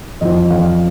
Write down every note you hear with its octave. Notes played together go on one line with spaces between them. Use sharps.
F2 F3 D#5
F2 F3 F5